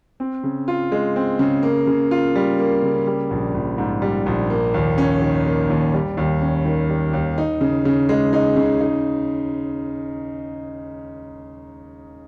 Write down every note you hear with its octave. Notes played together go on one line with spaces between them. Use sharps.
C4
C#3
F4
G#3
C4
C#3
A#3
C#3
F4
G3
A#3
C#3
G3
A#1
A#1
G#2
G3
A#1
A#3
D#2
C#4
D#3
A#3
D#2
G3
D#2
C#4
D#3
G3
D#2
D#4
C#3
C#3
G#3
D#4
C#3
D#4